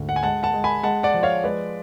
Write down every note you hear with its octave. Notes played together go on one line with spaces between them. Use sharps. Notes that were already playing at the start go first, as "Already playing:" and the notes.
Already playing: D2 G#2
F#5
G#5
G#3 F#5 A5
F#5 A5
G#3
G#5 B5
G#3 F#5 A5
D5 F#5
F3
C#5 F5
G#3 B4 D5